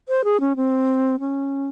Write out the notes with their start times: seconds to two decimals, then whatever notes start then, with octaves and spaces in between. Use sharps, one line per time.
0.08 C5
0.24 G#4
0.40 C#4
0.56 C4
1.20 C#4